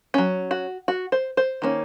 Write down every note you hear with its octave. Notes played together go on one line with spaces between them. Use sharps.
F#3 C#4
F#4
F#4
C5
C5
D#3 A#3 C#4